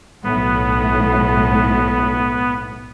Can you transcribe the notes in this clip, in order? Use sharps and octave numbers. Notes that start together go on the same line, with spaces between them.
B1 A2 B3